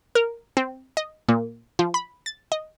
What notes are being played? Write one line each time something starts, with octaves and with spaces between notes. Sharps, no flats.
A#4
C4
D#5
A#2
F3
B5
A6
D#5